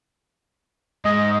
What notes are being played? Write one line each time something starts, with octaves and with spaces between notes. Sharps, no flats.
G#2 D#5